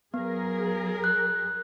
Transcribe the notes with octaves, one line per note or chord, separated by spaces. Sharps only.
F#3 B3 G#4 A#4
F#6